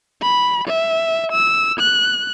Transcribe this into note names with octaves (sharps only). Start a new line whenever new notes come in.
B5
E5
E6
F#6